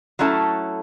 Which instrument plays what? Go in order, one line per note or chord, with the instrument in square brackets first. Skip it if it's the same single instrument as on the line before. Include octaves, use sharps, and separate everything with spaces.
[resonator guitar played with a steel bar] F#3 A3 C#4 E4 A4